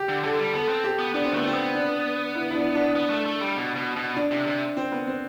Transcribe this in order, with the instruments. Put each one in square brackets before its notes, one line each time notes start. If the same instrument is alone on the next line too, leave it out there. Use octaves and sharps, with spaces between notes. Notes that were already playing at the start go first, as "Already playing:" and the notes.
Already playing: [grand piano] G4
[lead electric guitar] D3
[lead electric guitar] D3 [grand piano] A4
[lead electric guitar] G3
[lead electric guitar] B3 [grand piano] A4
[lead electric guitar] C4
[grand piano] G4
[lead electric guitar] B3
[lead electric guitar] B3 [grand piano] D4
[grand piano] C4
[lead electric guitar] A3 [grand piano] B3
[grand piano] C4
[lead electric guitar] B3
[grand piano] D4
E4
E4
D4
D4
[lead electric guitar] B3
A3
A3
G3
B2
B2
B2
[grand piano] D4
[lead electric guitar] C3
C3
[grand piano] C4
B3
C4